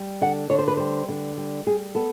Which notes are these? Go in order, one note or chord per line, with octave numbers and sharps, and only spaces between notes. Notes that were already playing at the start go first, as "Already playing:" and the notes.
Already playing: G3
D3 F#5
D3 C#5
C5
B4
G3 C5
D3
G3
G3 G#4
B3 A4